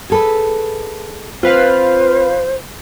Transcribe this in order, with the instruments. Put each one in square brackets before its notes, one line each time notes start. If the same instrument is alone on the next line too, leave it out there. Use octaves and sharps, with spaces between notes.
[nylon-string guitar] G#4 A4 B4
[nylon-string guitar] C4 [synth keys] F4 B4 F5 [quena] C5